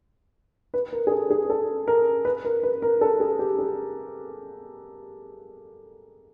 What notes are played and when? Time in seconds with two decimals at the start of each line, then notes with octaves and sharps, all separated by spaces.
0.74 B4
0.93 A#4
1.07 G#4
1.12 A4
1.31 G#4
1.50 A4
1.88 A#4
2.25 B4
2.45 A#4
2.63 B4
2.82 A#4
3.01 A4
3.20 G#4
3.39 G4
3.59 G#4